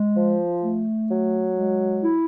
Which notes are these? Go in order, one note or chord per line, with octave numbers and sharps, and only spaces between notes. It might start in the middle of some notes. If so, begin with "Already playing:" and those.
Already playing: G#3
F3
A3
F#3
G#3
E4